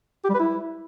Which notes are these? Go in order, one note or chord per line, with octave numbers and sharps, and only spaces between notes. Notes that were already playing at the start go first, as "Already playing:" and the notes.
G4
G3
B4
E4